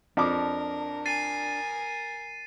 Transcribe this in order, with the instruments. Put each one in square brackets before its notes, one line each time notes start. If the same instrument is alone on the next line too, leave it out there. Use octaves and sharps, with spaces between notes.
[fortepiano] F2 D6 [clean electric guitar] D4 [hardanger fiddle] A#4
[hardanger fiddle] A#4 G#5 [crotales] A6 C7 D#7